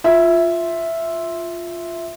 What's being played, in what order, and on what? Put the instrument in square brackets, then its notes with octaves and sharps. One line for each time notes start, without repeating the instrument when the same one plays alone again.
[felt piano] F4 E5